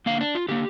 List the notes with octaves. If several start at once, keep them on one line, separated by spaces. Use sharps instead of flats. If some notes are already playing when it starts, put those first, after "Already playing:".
D3 A#3 F5
D4
F4
D3 A#3 G4